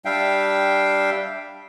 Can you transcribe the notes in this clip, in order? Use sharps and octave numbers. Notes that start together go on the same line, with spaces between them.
G3 D4 E5 F5 G5